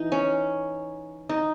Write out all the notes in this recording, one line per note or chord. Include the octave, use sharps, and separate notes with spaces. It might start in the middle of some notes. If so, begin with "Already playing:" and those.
Already playing: E3 D#4
C#4
D#4